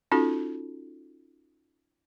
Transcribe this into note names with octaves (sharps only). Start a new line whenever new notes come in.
C#4 D#4 F4 F#4 A4